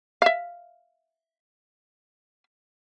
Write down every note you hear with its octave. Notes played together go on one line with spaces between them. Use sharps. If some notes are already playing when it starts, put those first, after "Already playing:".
E5 F5